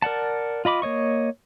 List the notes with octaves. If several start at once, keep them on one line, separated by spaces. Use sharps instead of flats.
A#4 D5 F#5 A5
F4 D#5 B5 D6
A#3 C#5 D#5 C#6